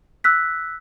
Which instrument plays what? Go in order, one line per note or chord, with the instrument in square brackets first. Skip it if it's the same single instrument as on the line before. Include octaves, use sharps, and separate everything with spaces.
[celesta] E6 F#6 B6